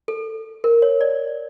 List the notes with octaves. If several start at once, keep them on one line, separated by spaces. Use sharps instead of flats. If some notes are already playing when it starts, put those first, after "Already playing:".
A4
A#4
C#5
D5